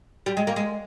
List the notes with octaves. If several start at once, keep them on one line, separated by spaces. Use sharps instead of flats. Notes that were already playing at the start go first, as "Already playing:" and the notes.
G3
G#3
A#3
G#3